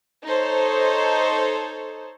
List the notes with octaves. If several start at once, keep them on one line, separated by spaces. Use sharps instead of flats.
D#4 A4 C5 C#5